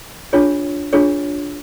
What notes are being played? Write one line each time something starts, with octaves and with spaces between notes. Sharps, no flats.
D4 F4 G#4 C#5
D4 F4 G#4 C#5